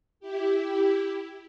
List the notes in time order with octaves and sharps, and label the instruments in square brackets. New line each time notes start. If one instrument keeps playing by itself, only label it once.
[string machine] E4 G4